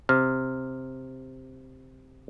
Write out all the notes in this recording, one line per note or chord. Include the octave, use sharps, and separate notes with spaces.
C3 F6